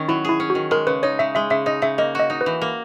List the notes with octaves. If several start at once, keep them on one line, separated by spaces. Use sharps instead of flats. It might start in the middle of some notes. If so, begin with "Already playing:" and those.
Already playing: D#3 C#4
F#3 E4
E4 G#4
C#4
F#4
D#3
G#3 A#4
C#3 B4
D#4 C#5
C#3 E5
G#3 E5
C#3 E5
D#4 D#5
C#3 E5
A#3 D#5
F#4 D#5
D#4
B4
E3
A#3